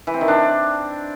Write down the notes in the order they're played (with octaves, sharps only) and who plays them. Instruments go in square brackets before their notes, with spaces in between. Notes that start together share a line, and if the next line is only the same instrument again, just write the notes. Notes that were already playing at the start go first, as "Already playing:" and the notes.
[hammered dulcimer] E3
C4
D#3
D4